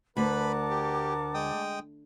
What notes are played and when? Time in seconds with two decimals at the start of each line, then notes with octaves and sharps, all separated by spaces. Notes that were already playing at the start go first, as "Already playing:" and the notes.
0.17 D2 A#4 B4 F#5 A5 B5 D6
0.70 G4
1.34 G#3 G5 D#6